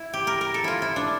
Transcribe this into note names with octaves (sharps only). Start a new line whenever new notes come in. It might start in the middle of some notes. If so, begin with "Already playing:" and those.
Already playing: E4
G4
A#4
A#4
A4
E4 F4
E4
D4